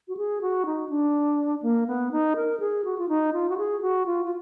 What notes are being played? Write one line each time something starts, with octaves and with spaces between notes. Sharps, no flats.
F#4
G#4
F#4
D#4
D4
A#3
B3
D#4
A#4
G#4
F#4
F4
D#4
F4
F#4
G#4
F#4
F4
F4